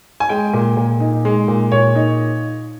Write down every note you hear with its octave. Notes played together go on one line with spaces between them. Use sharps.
G#5
G#3 G5
A#2
A#2
D#4
G#3
A#2
A#2 C#5
D#4